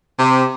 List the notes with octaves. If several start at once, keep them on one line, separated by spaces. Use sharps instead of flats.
C3